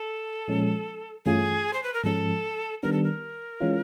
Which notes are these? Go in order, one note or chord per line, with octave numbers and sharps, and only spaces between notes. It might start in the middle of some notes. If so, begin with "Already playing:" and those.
Already playing: A4
A#2 F3 G#3 C#4
G2 E3 A3 C#4 F4 G#4
C5
B4
A#4
G#2 F3 G#3 C#4 A4
D#3 G3 B3 D4 A#4
A4
A#4
E3 G#3 C#4 F4